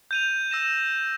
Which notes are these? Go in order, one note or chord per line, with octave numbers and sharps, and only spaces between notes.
G6 D#7 F7
E6 A#6 E7